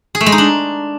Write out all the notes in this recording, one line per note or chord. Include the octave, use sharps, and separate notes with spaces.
G#4
A3
G#3
D#4
D4